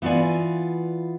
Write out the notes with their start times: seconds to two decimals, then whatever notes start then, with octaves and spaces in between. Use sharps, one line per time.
0.02 E3 B3 F4 D5 G#5